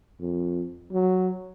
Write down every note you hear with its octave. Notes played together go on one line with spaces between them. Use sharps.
F2
F#3